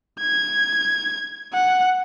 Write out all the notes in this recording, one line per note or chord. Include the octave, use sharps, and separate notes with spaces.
G#6
F#5